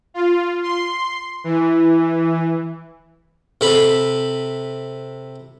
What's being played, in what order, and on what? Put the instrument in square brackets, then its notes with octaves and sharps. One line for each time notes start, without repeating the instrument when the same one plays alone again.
[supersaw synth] F4
C6
E3
[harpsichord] C3 A4 B5